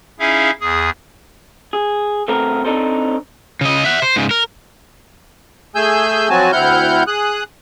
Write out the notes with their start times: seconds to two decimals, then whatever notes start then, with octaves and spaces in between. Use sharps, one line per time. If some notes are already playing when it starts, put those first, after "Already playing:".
0.20 C#4 D#4 E4 G#4 E5 F5
0.61 E2 G#4 D#6
1.73 G#4
2.28 B2 A3 B3 C4 A4 A#4
2.65 C4 D4 D#4 A4 C5
3.61 C#3 D#5
3.84 E5 F#5
4.02 C5
4.16 G#2 C#3
4.31 A#4
5.75 A3 G#4 G#5 E6 G6
6.29 F3 F#3 C4 F#4 G#5 A5
6.52 D2 C4 E4 F#5 F6 G6
7.07 G#4 D#6 F#6